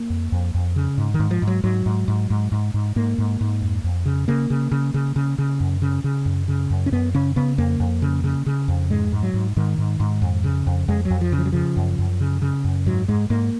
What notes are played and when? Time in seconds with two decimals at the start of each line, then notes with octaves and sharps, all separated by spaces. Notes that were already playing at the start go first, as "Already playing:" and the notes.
Already playing: A#3
0.10 F2
0.32 F2
0.54 F2
0.76 C#3
0.98 G#2
1.14 D#3
1.20 G#2
1.31 F3
1.42 G#2
1.47 F#3
1.64 G#2 F#3
1.86 G#2
2.08 G#2
2.30 G#2
2.52 G#2
2.74 G#2
2.96 G#2 A#3
3.18 G#2
3.41 G#2
3.62 F2
3.84 F2
4.06 C#3
4.28 C#3 A#3
4.50 C#3
4.72 C#3
4.94 C#3
5.16 C#3
5.38 C#3
5.60 F#2
5.82 C#3
6.04 C#3
6.26 F#2
6.48 C#3
6.70 F#2
6.86 C#4
6.92 F#2 B3
7.14 C#3 C#4
7.36 C#3 B3
7.58 F2 A#3
7.80 F2
8.02 C#3
8.24 C#3
8.46 C#3
8.68 F2
8.90 G#2 G#3
9.12 G#2
9.23 F#3
9.34 G#2
9.56 G#2 D#3
9.78 G#2
10.00 G#2
10.22 F2
10.44 C#3
10.67 F2
10.88 F2 G#3
11.05 F#3
11.10 F2
11.21 F3
11.32 C#3
11.38 F3
11.46 F#3
11.52 C#3 F3
11.77 F#2
11.99 F#2
12.21 C#3
12.42 C#3
12.64 F#2
12.86 G#2 F#3
13.08 G#2 G#3
13.30 G#2 A#3